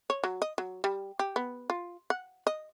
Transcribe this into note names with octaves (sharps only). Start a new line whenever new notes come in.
C#5
F#3
D#5
F#3
G3
G4
B3
F4
F#5
D#5